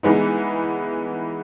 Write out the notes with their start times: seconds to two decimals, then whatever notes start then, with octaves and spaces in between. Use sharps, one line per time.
0.03 E3 G#3 B3 D#4